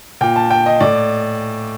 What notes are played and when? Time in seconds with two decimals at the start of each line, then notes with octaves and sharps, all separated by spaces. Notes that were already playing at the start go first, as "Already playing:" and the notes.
0.21 A#2 G5
0.36 A5
0.50 G5
0.66 D#5
0.81 A2 D5